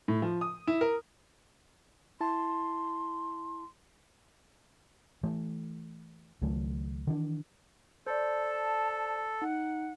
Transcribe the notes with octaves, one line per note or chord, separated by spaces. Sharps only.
A2
F3
D#6
E4
A#4
E4 A5 C6
E3 A3
C#2 D#3 F#3 A3
D#3 E3 D4
A4 C5 D5
A5
D#4 F#5